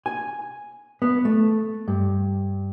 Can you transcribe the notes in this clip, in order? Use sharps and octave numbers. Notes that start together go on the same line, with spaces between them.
G#5
B3
A3
G2